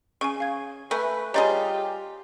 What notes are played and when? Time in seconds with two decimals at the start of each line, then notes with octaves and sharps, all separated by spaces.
0.21 C#3 G#5 C#6
0.40 F5 G#6
0.91 A3 B4 E5 G#5
1.34 G3 F4 G4 G#4 C#5 D#5 A#5